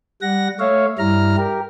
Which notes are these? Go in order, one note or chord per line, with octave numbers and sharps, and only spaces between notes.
G3 F#5 A#6
A3 C#5 E5 F5
G2 G3 E4 A#5 F6
G4 A#4